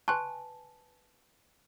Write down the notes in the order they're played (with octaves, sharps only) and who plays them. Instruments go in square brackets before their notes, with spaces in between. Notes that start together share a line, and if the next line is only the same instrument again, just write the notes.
[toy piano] B4 G#5 A5 [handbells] C6 C#6 F#6